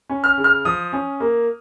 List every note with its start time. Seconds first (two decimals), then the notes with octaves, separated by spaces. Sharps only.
0.09 C#4
0.24 F6
0.38 C#3
0.44 F6
0.65 F3 D#6
0.93 C#4
1.20 A#3